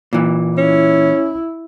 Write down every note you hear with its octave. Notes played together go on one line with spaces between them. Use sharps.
A#2 E3
C#4 E4